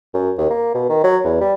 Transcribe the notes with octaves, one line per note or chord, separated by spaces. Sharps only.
F#2
D#2
A#3
B2
D#3
F#3
E2
G3